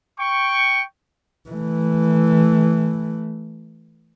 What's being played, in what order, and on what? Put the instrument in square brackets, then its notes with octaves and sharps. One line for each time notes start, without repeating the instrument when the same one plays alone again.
[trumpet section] G5 C#6
[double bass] E3 A3